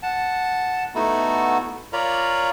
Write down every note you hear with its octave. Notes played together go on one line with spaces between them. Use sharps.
F#5 A5
A3 B3 D#4 E4 F#4 A4
F4 A#4 C#5 D5 A#5 B5